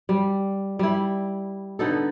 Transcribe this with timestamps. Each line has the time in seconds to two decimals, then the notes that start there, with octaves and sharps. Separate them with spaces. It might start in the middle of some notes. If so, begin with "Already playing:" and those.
0.09 G3
0.79 G3 E4
1.79 D3 B3 D#4 A4